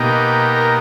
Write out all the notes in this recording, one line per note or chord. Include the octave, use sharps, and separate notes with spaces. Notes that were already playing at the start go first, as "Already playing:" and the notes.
Already playing: B2 A#3 D#4 G4
A#4